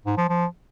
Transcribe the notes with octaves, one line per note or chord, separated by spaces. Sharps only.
G#2
F3
F3